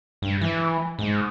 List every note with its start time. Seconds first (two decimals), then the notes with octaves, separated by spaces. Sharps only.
0.22 G2
0.42 E3
0.99 G#2